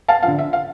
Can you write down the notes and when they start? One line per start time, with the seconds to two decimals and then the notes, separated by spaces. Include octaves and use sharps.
0.08 F5 A5
0.23 D3 F3 F5
0.38 E5
0.53 F5